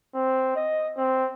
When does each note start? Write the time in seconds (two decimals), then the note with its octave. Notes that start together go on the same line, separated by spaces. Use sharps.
0.14 C4
0.56 D#5
0.97 C4